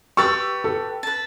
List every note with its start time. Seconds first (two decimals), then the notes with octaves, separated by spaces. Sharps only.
0.17 G4 B4 B5 C#6 E6 A6
0.64 A4
1.03 B4 A5